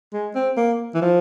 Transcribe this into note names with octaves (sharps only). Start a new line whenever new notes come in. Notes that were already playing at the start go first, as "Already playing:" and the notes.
G#3
C4
A#3
E3
F3